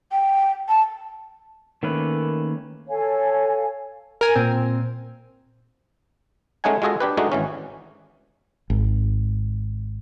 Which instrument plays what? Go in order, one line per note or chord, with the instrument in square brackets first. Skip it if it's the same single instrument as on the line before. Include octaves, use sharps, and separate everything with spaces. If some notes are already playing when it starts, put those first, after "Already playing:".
[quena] G5
A5
[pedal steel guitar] D#3 A3 A#3 C#4 B4
[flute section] A4 C#5 F5 G#5
[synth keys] A#4 G#5
[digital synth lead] A#2 [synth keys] C4
[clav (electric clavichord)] G#3 A3 C#4 D#4 F#5 G#5
G#3 F4 F#4 G#4 A4 D#5
D4 G4 B4
G#3 A3 D4 D#4 F#4
G#1 E3 C#4
[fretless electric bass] G#1